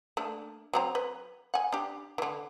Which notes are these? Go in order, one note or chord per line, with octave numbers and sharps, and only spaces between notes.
A3 A#3 D4
F#3 C4 A#5
B4
F#5 G#5
D4 G4
D3 E3